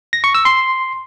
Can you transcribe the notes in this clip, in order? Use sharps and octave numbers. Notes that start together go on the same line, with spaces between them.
A#6
C#6
E6
C6